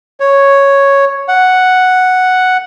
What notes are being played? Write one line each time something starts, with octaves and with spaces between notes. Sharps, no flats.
C#5
F#5